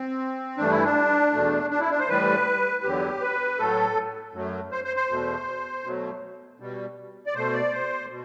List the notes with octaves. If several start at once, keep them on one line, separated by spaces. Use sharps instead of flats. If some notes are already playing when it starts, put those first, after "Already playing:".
Already playing: C4
G2 E3 A3 D4
E4
D4
E2 B2 A3
D4
E4
D4
C5
A2 E3 G3 B4
E2 D3 F#3 G4
B4
A2 F#3 A3 A4
F#2 F#3 A3
C5
C5
C5
E2 B2 A3
B2 F#3 A3
B2 G3
D5
B2 A3 C5
D5
C5
B2